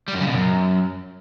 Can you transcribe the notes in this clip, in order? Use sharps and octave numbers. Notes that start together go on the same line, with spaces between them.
G3
F#2
C#3
B2
F#2